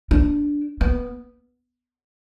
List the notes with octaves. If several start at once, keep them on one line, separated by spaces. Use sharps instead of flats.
D4
B3